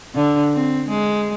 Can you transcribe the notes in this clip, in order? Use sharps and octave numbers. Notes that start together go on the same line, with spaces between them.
D3
C4
G#3